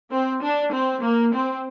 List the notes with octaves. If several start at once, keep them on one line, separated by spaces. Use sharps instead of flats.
C4
D4
C4
A#3
C4